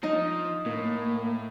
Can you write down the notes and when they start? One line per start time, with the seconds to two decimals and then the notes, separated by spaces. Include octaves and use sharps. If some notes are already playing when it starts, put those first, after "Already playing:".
0.03 F3 D#4 D#5
0.66 A2 A#3